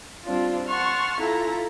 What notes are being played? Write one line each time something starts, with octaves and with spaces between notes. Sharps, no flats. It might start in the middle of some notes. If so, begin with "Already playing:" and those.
G3 C4 D4 F4
F#5 A5 C6 C#6 F6
E4 F4 A4 A#5